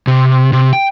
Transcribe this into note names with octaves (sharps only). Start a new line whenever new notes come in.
C3
C3
G5